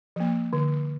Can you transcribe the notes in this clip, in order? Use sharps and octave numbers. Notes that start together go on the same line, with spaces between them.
F3 A#3
D3